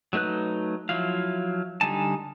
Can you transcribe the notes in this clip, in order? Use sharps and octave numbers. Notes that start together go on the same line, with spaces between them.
F#3 A3 D#4 B4 F#6
F3 F#3 E4 F4 F5
D3 G3 D#4 G#5 A5